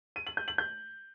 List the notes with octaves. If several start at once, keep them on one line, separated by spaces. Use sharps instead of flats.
D#7
F#7
G6
F#7
G6